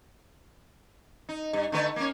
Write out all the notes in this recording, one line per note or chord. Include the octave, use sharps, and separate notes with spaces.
D#4
G2
D3 A3 B4
A#3 C#4